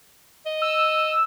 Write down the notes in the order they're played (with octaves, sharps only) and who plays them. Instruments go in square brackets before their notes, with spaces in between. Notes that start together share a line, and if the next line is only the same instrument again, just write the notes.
[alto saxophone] D#5
[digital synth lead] E6